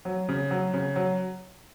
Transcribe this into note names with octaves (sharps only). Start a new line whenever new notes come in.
F#3
C#3
F#3
C#3
F#3